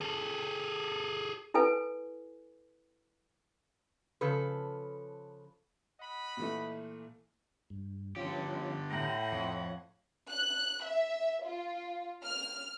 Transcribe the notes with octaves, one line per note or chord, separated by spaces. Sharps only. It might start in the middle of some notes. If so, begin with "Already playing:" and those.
G#4 A4
E4 A4 B4 G#5
C#3 F3 A4 B4
D#5 F#5 B5
A#2 E3 A3
G2
D3 F3 C#4 F4 G4
A2 F#5 G5 A#5
F2 C#5
F#6
E5
F4
F6